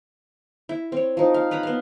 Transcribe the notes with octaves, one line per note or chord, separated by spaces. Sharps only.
E4
C4 C#5
F3 D#4
F5
B4 C#5 A#5 B5
B3 F5